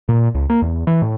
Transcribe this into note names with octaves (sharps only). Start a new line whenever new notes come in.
A#2
C#2
A#3
E2
E3
A2